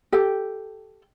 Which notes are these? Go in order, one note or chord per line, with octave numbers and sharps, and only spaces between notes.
G4 A4 G5